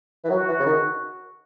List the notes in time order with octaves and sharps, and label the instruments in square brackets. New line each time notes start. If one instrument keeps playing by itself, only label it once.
[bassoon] E3
[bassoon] F#3 [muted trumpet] F#4
[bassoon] E3
C#3
D#3